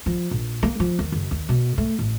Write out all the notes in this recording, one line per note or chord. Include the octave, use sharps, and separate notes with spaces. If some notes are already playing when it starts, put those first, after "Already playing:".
F3
A#1
A#3
F3
D#2
F#1
D#2
B2
A3
A1